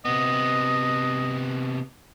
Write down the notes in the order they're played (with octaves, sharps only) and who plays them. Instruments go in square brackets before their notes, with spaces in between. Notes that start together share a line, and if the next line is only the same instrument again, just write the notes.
[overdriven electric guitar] C3 B3 [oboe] D#5